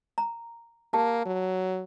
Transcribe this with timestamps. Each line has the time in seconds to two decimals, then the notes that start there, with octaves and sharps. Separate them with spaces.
0.18 A#5
0.93 A#3 G4 A5
1.26 F#3